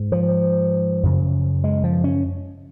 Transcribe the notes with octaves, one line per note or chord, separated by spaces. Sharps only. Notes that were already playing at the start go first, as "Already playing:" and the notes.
Already playing: G#2
F3
F#2 C#3
G#3
F3
C#4